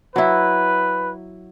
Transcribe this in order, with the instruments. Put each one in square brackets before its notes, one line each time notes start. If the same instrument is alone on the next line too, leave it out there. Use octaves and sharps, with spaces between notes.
[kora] F#3 E4 [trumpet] B4